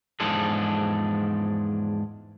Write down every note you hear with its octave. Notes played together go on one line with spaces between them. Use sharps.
E2 G#2 F3 D4 G#4 A4